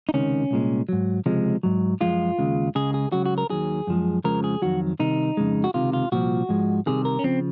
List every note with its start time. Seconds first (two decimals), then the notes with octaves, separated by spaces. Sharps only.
0.09 D#4
0.14 C#2 C3 D#3 C#4
0.51 C2 A#2 G#3
0.89 G#2 F#3
1.26 C#2 C3 F3 G#3
1.63 G#2 F#3
2.01 F#2 F3 G#3 F4
2.38 D#2 C#3 G#3
2.75 C#2 C#3 G#3 G#4
2.94 G#4
3.12 C#2 C#3 F#3 F#4
3.26 F#4
3.38 A#4
3.50 D#2 D#3 F#3 G#4
3.87 F#2 F3 G#3
4.24 F2 C#3 F3 G#3 A#4
4.44 G#4
4.62 F2 D#3 F#3 F#4
5.00 C2 C3 D#3 D#4
5.37 F2 C#3 G#3
5.64 F#4
5.74 C#2 C3 D#3 F4
5.93 F4
6.12 C2 A#2 F3 F#4
6.49 G#2 F3 G#3
6.86 C2 C3 D#3 G#4
7.05 A#4
7.19 C#4
7.24 C#3 F3 C4